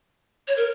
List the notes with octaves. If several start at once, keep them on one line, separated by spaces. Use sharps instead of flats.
C#5
A#4